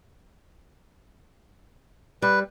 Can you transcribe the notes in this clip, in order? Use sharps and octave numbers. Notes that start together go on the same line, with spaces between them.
G3 B4